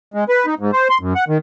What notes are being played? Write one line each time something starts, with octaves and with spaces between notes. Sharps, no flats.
G#3
B4
D#4
G#2
C5
C6
F#2
F#5
D#3